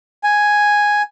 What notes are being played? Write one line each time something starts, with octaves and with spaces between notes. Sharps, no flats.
G#5